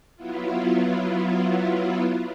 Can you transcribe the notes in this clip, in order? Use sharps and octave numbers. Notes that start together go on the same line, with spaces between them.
F#3 B3 E4 F4